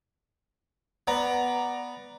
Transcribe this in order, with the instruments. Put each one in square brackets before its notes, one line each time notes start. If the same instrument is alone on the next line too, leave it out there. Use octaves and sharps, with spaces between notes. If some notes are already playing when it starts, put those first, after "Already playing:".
[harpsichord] B3 [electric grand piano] D5 A#5